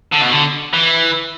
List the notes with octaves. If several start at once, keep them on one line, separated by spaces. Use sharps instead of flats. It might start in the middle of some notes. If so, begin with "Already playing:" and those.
D3
B2
D3
E3